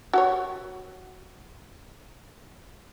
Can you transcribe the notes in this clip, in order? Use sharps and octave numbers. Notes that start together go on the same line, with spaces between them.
F#4 G4 C#5